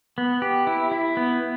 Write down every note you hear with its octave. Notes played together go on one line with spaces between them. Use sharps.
B3
G4
E4
E4
B3